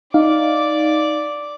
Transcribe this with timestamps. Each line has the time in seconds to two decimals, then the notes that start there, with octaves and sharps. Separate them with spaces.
0.14 D#4 D5 F5 D6